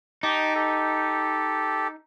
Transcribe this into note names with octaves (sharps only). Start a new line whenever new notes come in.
D#4 G4 A5 D6
G4 A4